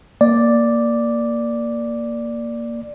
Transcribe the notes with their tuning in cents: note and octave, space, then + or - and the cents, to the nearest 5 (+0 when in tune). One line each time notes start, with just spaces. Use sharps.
A#3 +0 D5 +0